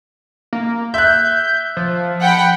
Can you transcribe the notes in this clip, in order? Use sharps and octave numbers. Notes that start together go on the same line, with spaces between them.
A#3
E5 F#6 G6
F3
F#5 G5 B5